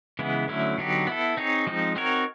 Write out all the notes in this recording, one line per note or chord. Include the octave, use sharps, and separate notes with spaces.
C#3 E3 G#3 B3 E4
D3 F#3 A3 C#4 E4
D3 F#3 B3 D#4 G4
B3 E4 A4
C4 D#4 G#4 C#5
F3 G#3 C4 D#4
C4 D#4 F#4 A#4 C#5